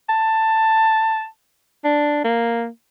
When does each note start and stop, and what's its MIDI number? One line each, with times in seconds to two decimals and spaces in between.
0.09 1.26 81
1.85 2.21 62
2.24 2.67 58